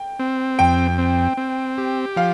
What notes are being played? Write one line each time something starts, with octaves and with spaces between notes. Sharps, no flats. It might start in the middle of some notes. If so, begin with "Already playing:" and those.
Already playing: G5
C4
F2 G5
C4
C4
G4
F3 F5